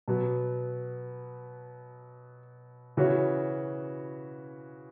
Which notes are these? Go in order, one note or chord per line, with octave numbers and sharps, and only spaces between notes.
B2 F#3 B3
C#3 E3 B3 F#4 C#5